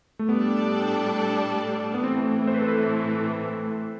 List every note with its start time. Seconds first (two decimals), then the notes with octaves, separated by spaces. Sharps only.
0.19 A3
0.28 A2 G3 B3 D4 A4 D5
1.94 B3
2.04 A2 E3 A3 C4
2.47 C5
2.54 B4
2.61 A4
2.68 B4